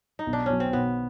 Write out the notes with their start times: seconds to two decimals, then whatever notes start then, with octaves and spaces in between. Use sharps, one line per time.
0.19 D#4
0.27 B1
0.33 D4
0.46 B2 F#3 C#4
0.60 C4
0.73 B1 B3